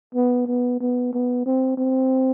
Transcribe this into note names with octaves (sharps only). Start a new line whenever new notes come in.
B3
B3
B3
B3
C4
C4